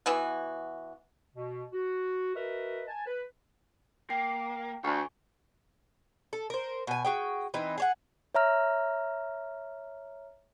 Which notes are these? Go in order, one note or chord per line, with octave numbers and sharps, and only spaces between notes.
E3 B3 F#4
B2
F#4
F#4 A#4 B4 D#5 E5
G#5 A5
B4
A#3 G5 C7
D2 G#5 C#6
A4
A#4 C5
B2 G#5
F#4 G#4 G5
E3 C4 D#4
G#4 C#5 F#5
C#5 E5 A#5 F6